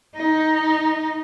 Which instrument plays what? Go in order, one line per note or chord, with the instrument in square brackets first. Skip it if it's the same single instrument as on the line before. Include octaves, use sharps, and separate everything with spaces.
[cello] D#4